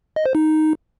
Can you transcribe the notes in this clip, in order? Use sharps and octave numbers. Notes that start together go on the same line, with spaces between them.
D#5
C5
D#4